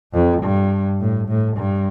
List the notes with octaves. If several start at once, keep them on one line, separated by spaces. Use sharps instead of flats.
F2
G2
A2
A2
G2